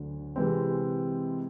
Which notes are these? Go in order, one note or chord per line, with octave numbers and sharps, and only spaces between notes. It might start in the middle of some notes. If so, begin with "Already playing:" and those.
Already playing: D2 D3 F#3
C3 E3 G#3 C4